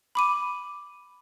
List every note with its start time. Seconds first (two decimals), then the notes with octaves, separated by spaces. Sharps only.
0.15 B5 D6 D#7